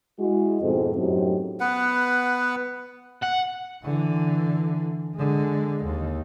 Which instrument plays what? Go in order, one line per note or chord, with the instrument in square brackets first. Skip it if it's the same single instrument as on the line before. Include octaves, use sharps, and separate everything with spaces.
[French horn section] G#3 E4 F#4
F2 G#2 B2 C4 G#4 A4
F#2 A2 F#3 C4 D#4 G4
[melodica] B3 B4 F#5
[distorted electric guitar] F#5
[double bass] D3 E3
D3 G#3
D#2